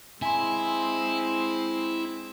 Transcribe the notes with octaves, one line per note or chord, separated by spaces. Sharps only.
G#3 C4 E4 G#5 C6